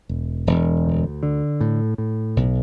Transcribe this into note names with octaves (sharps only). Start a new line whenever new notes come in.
E1
E1
D2
D3
A2
A2
B1